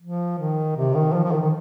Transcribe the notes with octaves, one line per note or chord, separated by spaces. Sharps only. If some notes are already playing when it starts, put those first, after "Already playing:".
F3
D#3
C3
D#3
F3
F3
D#3
D#3